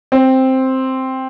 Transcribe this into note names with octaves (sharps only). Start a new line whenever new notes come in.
C4